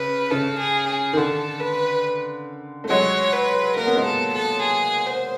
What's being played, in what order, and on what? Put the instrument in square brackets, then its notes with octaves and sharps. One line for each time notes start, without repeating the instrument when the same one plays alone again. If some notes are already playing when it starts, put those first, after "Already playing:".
Already playing: [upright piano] C#3 [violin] B4
[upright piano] C#3 [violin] A4
[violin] G#4
G#4
[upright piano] D#3
[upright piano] D3 [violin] A4
[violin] B4
[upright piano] A3
[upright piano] F#3 G#3 [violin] C#5
[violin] B4
[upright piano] A#3 [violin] A#4
[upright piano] B3
G#3 A#3
[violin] A4
A4
G#4
C5